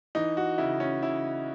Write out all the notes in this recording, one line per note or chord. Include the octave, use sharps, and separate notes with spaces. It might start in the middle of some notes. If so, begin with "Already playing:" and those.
E3 D#4
F#4
C#3 E4
C#4
C#3 E4